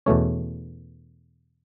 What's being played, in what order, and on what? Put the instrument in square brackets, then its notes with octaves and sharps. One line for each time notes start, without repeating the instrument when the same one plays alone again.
[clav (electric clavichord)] E2 B2 A3 C#4 C#5